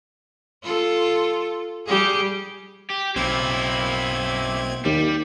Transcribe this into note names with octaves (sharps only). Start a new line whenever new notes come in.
F4 A4
G3 G4 G#4
G4
B1 A#3 C4 E4 G#6
D#2 G3